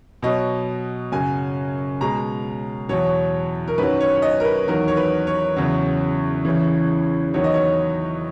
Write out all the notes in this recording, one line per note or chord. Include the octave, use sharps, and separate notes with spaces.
B2 F#3 D#5
F#2 C#3 F#3 G#5
B2 G#3 A#5
E2 B2 F#3 C#5
A#4
F#2 D#3 F#3 B4
C#5
C#5
D#5
A#4
B4
E2 D#3 F#3 A#4
C#5
B4
C#5
E2 C#3 F#3
E2 C#3 E3
E2 D#3 F#3 C#5
D#5
C#5